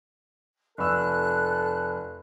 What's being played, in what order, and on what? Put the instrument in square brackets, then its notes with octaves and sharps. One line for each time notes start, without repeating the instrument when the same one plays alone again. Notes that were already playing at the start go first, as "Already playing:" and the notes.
[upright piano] F1 E6 [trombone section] A4 [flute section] F#6